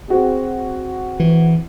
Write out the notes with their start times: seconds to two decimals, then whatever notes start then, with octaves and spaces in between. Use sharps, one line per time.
0.08 C4 F#4 G#4
1.20 E3